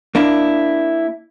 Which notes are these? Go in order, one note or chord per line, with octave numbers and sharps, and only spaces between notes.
A#3 D4 E4